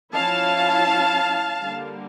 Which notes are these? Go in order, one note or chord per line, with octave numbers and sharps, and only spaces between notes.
F3 C#4 E4 F5 A5
D3 G3 A#3